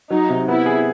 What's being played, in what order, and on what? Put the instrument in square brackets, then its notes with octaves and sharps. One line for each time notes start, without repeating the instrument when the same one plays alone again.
[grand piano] F#3 [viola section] D#4
[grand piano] C3
[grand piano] B3 [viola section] E4
[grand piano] G#4